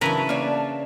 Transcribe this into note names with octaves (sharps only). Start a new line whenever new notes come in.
C#3 E3 F#3 D4 A#4 B4 A5 A#5
A#3 C#5 D5